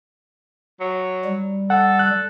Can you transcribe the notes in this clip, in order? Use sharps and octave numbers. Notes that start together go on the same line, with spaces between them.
F#3
G3
A4 F#5
F#6